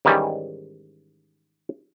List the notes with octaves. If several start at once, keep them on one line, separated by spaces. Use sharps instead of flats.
G#2 D#3 E3 G3 C#4